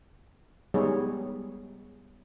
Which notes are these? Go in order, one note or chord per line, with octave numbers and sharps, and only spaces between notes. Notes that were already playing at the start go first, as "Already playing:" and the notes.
G3 G#3 B3 D#4 G#4 C#5